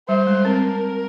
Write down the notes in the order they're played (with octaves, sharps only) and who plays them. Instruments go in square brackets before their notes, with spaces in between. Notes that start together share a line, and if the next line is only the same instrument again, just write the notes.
[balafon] G3 [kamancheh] C5
[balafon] G#3
[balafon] C4 [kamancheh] A#4